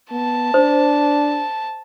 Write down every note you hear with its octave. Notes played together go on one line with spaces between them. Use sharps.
B3 A5
D4 C5